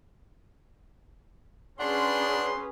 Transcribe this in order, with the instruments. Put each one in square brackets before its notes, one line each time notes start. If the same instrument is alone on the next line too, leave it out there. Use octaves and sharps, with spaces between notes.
[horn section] F#2 F#5 C6 [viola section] C#4 G#4 B4 [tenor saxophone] D4